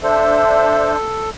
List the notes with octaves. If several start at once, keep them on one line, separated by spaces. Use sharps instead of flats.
D4 A4 C5 E5